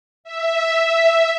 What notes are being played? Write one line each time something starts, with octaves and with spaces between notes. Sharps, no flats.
E5